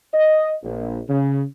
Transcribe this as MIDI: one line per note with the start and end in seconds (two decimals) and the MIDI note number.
0.14 0.53 75
0.63 1.00 34
1.09 1.42 49